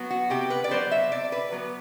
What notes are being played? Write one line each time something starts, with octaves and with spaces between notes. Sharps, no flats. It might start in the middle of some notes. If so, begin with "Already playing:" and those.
Already playing: F#3 B3
F#4
C3 G4
B4
D5
F#3 B3 C5
E5
C3 D5
B4
F#3 B3